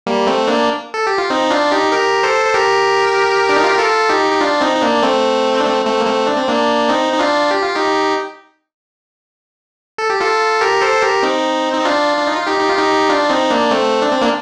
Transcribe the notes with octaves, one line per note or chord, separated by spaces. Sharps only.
G3 A#3
A3 C4
A#3 D4
A4
G4
F4
C4 D#4
D4 F4
D#4 G4
G4 A#4
A4 C5
C5
G4 A#4
D4
D#4
F4
G4
F4 A4
D#4 G4
G4
D4 F4
C4 D#4
D#4
A#3 D4
A3 C4
D4
A3 C4
A3 C4
A#3
A3 C4
D4
C4
A#3 D4
C4 D#4
D#4
D4 F4
G4
F4
D#4 G4
A4
G4
F4 A4
G4 A#4
A4 C5
G4 A#4
C4 D#4
D#4
D4 F4
D4
D#4
F4
D#4 G4
D#4
F4
D#4 G4
D4 F4
C4 D#4
A#3 D4
A3 C4
D4
C4
A#3 D4